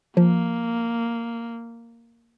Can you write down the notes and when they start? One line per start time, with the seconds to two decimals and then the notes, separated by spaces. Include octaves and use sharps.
0.17 F3 A#3